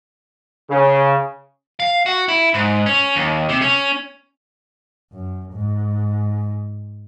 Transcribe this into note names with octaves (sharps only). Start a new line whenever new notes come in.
C#3
F5
F#4
E4
G#2
C#4
D#2
C3
C#4
F#2
G#2